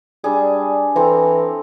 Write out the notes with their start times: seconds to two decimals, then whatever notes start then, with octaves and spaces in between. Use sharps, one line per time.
0.24 G3 D4 G#4
0.96 E3 C4 A4 A#5